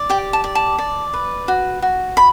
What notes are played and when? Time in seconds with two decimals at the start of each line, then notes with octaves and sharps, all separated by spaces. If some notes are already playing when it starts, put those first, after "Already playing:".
Already playing: D5
0.10 G4 G5
0.33 A5
0.44 D5
0.55 A5
0.78 D5
1.13 B4
1.48 F#4
1.82 F#4
2.17 B5